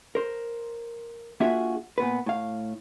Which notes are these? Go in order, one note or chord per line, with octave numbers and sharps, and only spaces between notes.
A#4 C5
A#3 D4 F4 F#4 G#4 E5
A#2 B3 B4
A2 F5